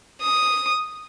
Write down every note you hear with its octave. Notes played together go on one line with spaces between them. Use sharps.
D#6